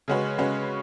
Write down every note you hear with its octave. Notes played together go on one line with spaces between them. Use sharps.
C#3 G#3 C#4 F#4 B4
C#3 G#3 C#4 F#4 B4